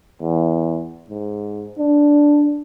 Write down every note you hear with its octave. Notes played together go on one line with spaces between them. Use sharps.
E2
G#2
D4